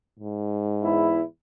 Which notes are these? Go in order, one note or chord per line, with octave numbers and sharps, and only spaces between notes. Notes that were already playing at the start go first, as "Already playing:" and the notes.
G#2
E2 E4